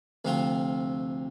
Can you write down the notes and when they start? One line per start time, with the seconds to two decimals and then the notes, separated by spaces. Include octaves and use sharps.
0.25 D2 C3 F3 C4 F4